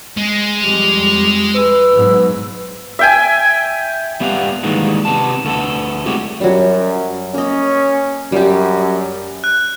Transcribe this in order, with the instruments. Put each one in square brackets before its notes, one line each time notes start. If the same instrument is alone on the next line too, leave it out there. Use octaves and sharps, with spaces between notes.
[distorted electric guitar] G#3
[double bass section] F2 G3 [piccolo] F7
[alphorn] B4 [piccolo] E6
[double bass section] G#2 B2 F#3
[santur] E5 G5 G#5
[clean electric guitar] G3 B3 G4 F5 F#5
D#3 E3 G3 G#3 A#3 B3
C3 B3 A5
D2 A3 B3 A4
G3 G#3 C4 E4 F#4 G4
[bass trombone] F#2 [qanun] F#3 G3
[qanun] A#3 D#5 [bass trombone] C#4
[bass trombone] F#2 [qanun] G3 G4
[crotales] F#6